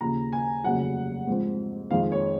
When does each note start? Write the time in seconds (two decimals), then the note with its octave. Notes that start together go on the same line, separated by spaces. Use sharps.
0.01 D#2 C#3 F3 A#5
0.32 G#5
0.64 F1 D#2 C#3 F#3 F#5
1.27 G#2 F3 C4
1.91 F2 D#3 G#3 F5
2.12 C#5